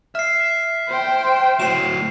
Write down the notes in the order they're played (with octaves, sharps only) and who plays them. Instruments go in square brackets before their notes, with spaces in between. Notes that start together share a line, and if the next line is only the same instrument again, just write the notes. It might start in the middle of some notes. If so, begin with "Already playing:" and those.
[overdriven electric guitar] E5 [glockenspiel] F6 C7
[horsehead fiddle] C5 G5
[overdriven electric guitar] A2 F#3 [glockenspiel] C7 E7